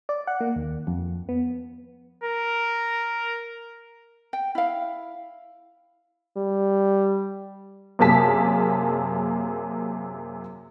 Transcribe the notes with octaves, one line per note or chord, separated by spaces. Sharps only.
D5
F#5
A#3
D#2
F2
B3
A#4
G5
E4 F5
G3
F#2 C3 A#3 G#4 A5 B6